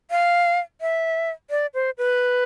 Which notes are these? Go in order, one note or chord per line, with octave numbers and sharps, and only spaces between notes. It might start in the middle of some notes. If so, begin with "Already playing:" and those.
F5
E5
D5
C5
B4